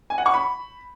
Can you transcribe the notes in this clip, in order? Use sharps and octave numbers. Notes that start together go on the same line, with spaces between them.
G#5
F#5
C#6
B5